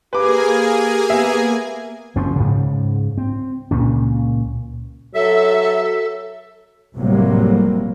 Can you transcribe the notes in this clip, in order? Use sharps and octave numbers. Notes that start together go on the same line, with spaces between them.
A#3 G4 G#4 B4 G#5 D6
B3 E5
F#1 G#2 F3 C#4
G#2 C#3
C4
C#2 A#2 C#4
F#3 A4 E5
F1 A2 C3 F#3 G3 A#3